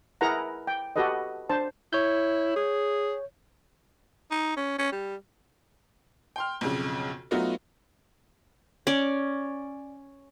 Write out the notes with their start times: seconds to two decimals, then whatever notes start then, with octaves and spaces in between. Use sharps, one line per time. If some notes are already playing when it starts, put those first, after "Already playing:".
0.21 E4 G#4 A#4 B4 F#5 A#5
0.67 G5
0.96 F#4 G4 A4 B4 D#5
1.49 D4 C5 A5
1.93 E4 C#5 G6
2.56 G#4
4.31 D#4
4.57 C#4
4.78 C#4
4.92 G3
6.36 G5 C6 F6
6.61 B1 F2 C#3
7.31 F#3 A3 B3 D#4 F4 F#4
8.87 C#4 D5